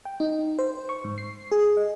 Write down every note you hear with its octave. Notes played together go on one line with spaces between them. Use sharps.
G5
D#4
C5
C#6
G#2
C7
G#4
D#5